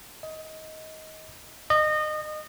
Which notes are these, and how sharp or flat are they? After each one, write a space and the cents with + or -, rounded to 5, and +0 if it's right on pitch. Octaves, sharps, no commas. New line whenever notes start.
D#5 +20
D#5 -25